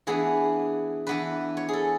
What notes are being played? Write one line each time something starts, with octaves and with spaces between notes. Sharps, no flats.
E3 B3 D4 G#4
E3 B3 D4 B4
C#5
G#4 A4